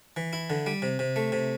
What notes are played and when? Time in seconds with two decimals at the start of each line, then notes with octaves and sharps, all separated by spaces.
0.17 E3
0.33 E4
0.50 D3
0.66 G3
0.82 C3
0.99 C3
1.16 A3
1.32 C3